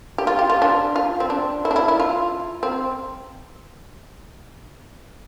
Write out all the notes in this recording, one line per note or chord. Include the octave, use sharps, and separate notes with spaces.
G4
F4
G4
F4
D4
F4
C4
D4
E4
D4
E4
E4
F4
C4